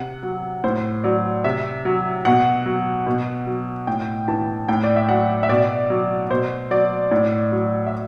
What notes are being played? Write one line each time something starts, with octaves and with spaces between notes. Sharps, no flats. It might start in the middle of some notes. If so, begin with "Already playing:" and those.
Already playing: C3 F#5
F#3
A2 C5
F#3 D5
C3 E5
F#3
B2 F#5
F#3
B2
F#3
A2 G5
E3 A5
A2 G5
D5
E5
F#3 F#5
E5
B2 D5
F#3
B2 C5
F#3 D5
A2 D5
F#3
E5